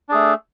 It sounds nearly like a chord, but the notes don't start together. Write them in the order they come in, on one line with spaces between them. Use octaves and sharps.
D4 G#4 A3